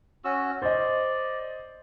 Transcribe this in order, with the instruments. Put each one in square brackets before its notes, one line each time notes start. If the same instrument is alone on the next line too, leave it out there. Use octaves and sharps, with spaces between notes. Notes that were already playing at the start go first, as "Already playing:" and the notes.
[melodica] C#4 F#4 E6
[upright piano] C5 D#5 [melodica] D5